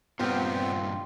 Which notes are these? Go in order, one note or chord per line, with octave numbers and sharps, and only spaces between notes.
G2 A#2 B3 C4 F4 G4